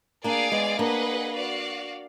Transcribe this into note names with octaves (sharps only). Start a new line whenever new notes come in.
A#3 D4 G#4 D5 F5 G#5
G#3 B3
A#3 D4 G#4 B4 D#5 F#5
F#4 D5 F5